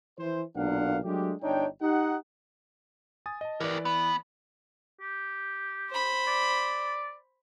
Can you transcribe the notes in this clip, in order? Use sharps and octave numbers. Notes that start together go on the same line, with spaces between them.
E3 C5
B1 A#2 A#3 D4 F5 F#5
F#3 G#3 A3 D4 G4
G1 D4 D#4 C#5 G5
D#4 G4 F#5
G#5 D#6 A6
D#5 A5
E3 G4 A#4 B4 D5
B3
G4
C5 B5
D5